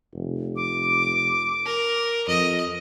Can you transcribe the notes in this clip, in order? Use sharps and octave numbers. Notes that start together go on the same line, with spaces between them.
F1
D6
A#4
F2 D#5